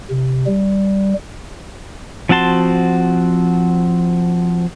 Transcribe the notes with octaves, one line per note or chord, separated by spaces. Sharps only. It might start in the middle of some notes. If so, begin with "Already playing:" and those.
C3
G3
F3 C4 F#4 A5 C6